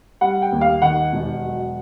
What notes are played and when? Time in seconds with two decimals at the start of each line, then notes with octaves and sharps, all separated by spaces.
0.21 G3 F#5
0.42 G5
0.52 D#2
0.61 F5
0.82 D#3 F#5
1.13 E1
1.44 F#3